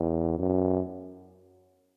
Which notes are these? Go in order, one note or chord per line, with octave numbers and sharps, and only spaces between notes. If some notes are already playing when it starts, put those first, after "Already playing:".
Already playing: E2
F#2